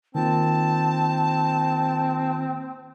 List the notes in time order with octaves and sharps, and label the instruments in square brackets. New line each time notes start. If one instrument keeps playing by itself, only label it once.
[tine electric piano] D#3 A#3 F4 [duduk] C4 [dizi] A5